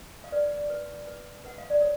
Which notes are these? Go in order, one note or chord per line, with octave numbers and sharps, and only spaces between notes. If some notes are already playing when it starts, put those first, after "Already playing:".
F5
B4 D5
B4
B4
B4 F#5
F5
D5
C#5